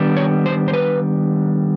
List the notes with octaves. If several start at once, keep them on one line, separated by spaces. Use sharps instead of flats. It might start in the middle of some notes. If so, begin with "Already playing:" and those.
Already playing: D#3 G3 B3 D4
C#5
C5
C5
B4